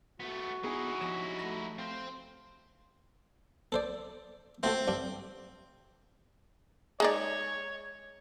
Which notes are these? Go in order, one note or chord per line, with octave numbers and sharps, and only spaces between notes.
A3 B3 F#4
B3 D#4 E4 G#4 G#5
F3 G4 C#5 G#5 A#6 E7
A3 A#6
C4 C5 F5
A4 C5 D5
A3 C4 F#4 A4
G2 D4
G#3 D#4 C#5 D5